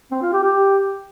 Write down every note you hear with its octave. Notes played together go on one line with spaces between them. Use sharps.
C4
F4
G4
G4